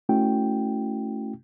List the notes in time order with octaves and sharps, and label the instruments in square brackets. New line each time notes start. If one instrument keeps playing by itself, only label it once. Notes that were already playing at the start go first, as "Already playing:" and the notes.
[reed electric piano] A3 C#4 E4 F#4 G5